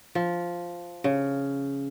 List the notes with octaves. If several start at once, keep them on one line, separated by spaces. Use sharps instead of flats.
F3
C#3